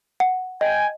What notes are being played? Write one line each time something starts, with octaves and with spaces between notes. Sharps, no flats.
F#5
D#5 G5 G#5